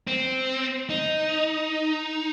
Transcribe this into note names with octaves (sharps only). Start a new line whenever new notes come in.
C4
D#4